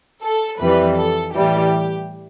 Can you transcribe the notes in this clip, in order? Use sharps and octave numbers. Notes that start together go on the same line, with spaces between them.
A4
F2 E3 G3 B4
A4
A2 E3 G3 G4